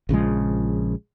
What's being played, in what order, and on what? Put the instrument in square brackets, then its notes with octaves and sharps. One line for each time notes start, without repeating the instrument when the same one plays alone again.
[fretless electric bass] A#1 C#3 F3 G#3